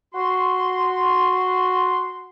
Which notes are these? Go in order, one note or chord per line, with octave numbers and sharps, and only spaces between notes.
F#4 C6